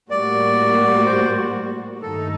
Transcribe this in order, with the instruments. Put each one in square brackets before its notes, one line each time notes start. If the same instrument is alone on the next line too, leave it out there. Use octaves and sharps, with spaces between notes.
[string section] A2 G3 A#3 F#4 [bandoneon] D5
[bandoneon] C5
[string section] G2 D#3 A3 D#4 [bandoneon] A4